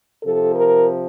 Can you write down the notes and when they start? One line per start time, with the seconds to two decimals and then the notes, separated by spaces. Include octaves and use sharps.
0.23 C3 F3 A4
0.56 A#4